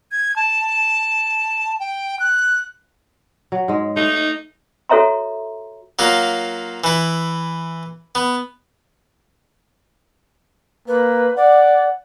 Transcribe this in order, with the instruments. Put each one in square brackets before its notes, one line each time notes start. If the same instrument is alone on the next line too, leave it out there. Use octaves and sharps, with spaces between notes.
[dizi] G#6
A5
G5
F#6
[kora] F#3
G#2 G#3
[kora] A3 [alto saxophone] D#4
[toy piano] F#4 A4 C#5 E5 A#5 C6
[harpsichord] F#3 A#3 F4
E3 E4
B3
[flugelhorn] A#3 [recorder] B4
[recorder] D5 [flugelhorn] F#5